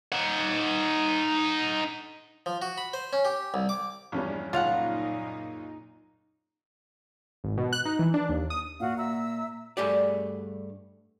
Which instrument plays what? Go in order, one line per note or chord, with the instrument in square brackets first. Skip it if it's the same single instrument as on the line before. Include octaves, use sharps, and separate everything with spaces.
[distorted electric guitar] D#4 F#5
[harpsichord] F3
F#4
B5
C5
C#4
G4
C2
D6
[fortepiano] A#1 E2 G3 [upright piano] G2 C#4
[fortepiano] C#2 [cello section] F#2 A#2 D#4 [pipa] F4 F5 F#5
[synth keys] G#1
B2
F#6
D#4
E3
D4
D#2
D#6
[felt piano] A#2 [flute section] F#4 F5 F#5
[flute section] E5 A#5 E6
[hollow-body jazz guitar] G2 A3 G4 G#4 D5